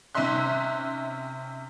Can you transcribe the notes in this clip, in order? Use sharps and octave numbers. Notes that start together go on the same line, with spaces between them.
C3 C#4 D#4 E5 C6 F#6